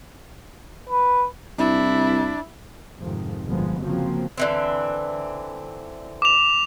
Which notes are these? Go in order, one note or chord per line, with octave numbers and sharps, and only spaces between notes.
B4
C2 D4 E4
F2 G#2 C3 D#3 F3
G1 B2 F3 G#3 A#3 B3
C#3 F3 F#3 A#3 C4
D3 E3 C4
D6 F7